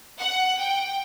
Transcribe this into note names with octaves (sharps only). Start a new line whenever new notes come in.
F#5
G5